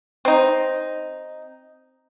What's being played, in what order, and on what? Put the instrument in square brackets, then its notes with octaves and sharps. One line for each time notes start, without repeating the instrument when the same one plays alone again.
[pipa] C4 D#4